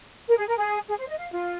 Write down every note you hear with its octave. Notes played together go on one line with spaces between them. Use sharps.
A#4
G#4
A#4
G#4
G#4
C5
D#5
F5
F4